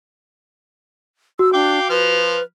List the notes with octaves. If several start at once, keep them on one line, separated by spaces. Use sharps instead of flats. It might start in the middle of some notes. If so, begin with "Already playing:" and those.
F#4 E6
D4 F5 G5 D6
F3 B4 F6